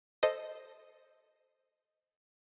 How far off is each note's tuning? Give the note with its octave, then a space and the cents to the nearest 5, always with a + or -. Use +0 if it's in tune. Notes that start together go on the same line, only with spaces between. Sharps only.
A4 +0 C5 +0 D#5 +0